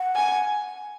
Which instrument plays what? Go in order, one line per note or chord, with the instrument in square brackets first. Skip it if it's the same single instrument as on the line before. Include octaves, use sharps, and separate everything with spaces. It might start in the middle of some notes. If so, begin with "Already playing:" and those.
Already playing: [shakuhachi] F#5
[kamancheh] G#5